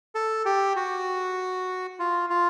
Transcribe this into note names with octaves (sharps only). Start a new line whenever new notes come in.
A4
G4
F#4
F4
F4